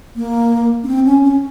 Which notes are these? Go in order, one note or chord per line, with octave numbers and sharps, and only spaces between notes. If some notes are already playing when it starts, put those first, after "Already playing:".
A#3
C#4
C4
C#4
C#4